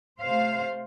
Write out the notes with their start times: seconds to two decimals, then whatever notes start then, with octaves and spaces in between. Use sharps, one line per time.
0.22 C3 A3 C5 F5